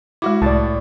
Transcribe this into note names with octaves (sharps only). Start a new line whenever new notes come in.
G#3 E4 F#4 D6
C2 A2 D5 A5